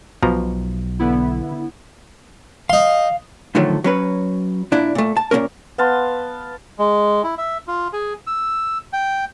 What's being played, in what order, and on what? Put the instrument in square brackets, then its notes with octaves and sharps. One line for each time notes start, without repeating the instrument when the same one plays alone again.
[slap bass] B1 [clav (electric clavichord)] B2 F3 A#5
[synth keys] D3 B3 E4
[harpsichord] D#4 C6 [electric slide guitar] F5
[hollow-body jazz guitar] A2 D3 D#3 F3 F#3 A3
F#3 C#4 B4
A#2 D4 E4
A#2 A3
A5
A#2 G#3 A#3 C#4 A#4
[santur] B3 F5 A5 C6
[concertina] G#3
E4
E5
F4
G#4
E6
G5